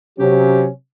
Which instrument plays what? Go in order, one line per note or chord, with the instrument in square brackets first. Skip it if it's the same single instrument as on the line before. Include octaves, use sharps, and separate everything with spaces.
[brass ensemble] C3 F#3 C#4 [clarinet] G4